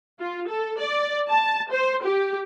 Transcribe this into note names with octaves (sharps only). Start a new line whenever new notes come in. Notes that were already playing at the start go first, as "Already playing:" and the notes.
F4
A4
D5
A5
C5
G4